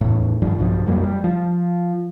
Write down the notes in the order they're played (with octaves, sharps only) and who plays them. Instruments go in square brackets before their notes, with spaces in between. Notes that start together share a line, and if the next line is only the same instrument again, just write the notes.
[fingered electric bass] E2 A2
G2 D#3 F3 D4
B1 G2 B2 F3
F2 F#3 G3 A#3
G3
F3